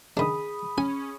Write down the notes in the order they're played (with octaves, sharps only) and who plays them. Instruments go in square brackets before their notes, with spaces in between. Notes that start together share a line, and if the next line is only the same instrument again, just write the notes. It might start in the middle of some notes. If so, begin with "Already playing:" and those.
[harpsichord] D#3 D4 [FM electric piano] G#4 B5 D#6
[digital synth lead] C#4 [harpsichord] G#5